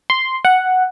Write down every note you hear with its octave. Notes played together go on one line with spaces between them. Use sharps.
C6
F#5